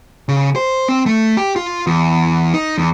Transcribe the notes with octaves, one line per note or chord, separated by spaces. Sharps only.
C#3
C5
C4
A3
G4
F4
E2
D#4
E2